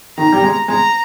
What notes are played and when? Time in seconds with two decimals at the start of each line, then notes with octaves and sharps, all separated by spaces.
0.18 D#3 A#5
0.32 G3
0.44 G#3
0.68 G#3 A#5